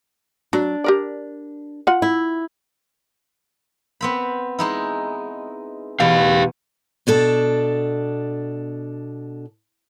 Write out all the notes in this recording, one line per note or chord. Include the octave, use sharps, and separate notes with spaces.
F#3 D4
G4 A#4 D5
F4 F#5
E4
B3 C4 B5
G#3 D#4 E4
E2 B2 G4 F5
B2 D4 A4